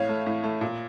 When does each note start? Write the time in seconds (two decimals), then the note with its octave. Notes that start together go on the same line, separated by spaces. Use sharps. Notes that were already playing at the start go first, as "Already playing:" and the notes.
Already playing: A2 C#5 F5
0.09 A3
0.26 A2
0.43 A3
0.61 A#2